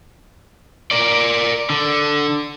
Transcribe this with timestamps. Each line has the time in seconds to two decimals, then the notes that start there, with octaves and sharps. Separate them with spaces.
0.91 A#4 D5
1.70 D3